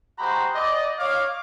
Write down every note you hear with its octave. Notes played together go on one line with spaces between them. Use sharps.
G#3 F#4 G4 C5 A#5 B5
D5 D#5
C#5 F5 D6